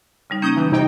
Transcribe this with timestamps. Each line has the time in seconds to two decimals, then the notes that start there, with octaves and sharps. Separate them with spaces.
0.30 C#3 G3 D#4
0.42 A#3 C#4 D#6 G6 G#6
0.56 E3
0.72 C3 D#4 G5